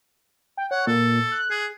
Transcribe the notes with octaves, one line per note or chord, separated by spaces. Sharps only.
G5
C#5 F#5
A#2 A4
F#6
G#4